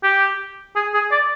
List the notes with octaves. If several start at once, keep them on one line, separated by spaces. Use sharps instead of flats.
G4
G#4
G#4
D5